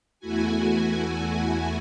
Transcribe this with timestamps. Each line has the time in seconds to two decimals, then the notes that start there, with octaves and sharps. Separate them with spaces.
0.19 E2 A3 E4 F#4 G#5